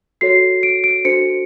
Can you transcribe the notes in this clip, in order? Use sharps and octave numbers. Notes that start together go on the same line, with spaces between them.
F#4 A4 C#5 C7
D7
D7
D4 F#4 A4 C5 C#7